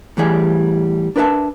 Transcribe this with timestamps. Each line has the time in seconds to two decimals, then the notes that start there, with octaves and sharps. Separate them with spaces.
0.17 A2 E3 G3 G#4 D5
1.16 D4 A#4 B4 D#5 E5 A5